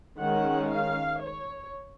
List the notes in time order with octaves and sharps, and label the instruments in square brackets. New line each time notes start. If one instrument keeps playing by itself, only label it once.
[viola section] D#3 G#3 C#4 F#5
F5
C#5